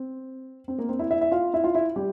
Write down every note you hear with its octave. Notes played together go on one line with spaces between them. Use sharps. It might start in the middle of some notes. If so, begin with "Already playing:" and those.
Already playing: C4
C4
A#3 A#4
C4 C5
E4 E5
E4 E5
E5
F4 F5
E4 E5
F4 F5
E4 E5
G3 G4